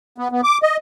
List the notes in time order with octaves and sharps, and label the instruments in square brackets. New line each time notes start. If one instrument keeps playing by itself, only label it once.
[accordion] B3
B3
D6
D#5